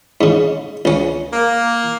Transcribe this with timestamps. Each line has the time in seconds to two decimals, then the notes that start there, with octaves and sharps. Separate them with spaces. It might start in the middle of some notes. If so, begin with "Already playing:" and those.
0.21 G#2 C#3
0.85 C#2 C#4
1.32 A#3